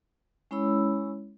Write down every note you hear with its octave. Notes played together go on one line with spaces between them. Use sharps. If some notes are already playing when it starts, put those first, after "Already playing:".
G#3 C#4 E4 C#5 B5 E6